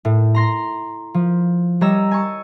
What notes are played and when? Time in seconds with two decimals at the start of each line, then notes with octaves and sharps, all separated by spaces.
0.05 A2
0.35 A#5 C6 A#6
1.14 F3
1.81 G3 C#5 D#5 A#5 E6
2.11 G#5 A5 C#6